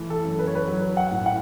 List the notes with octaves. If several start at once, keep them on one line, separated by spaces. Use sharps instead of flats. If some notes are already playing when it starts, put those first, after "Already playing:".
Already playing: E3 A3
A4
F#2
B4
C#5
B4
F#3
F#5
A2
F#5